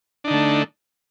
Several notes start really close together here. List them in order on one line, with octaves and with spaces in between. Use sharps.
D4 D#4 D3 A3